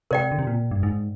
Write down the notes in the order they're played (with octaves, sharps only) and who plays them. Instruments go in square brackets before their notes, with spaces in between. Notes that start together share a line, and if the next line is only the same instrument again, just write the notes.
[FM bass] C3 [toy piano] A#4 D5 G5
[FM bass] D3
C3
A#2
G2
G#2